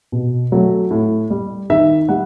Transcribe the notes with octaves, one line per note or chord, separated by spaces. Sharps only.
B2
F#3 A3
A2
G3
D#3 E5
G3 F#5